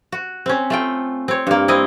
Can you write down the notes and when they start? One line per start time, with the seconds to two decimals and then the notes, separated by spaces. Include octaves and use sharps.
0.12 F#4
0.46 C4 C#4
0.70 A3 F4 G5
1.28 C4 C#5
1.47 G2 A#3
1.68 C4 E4 D#5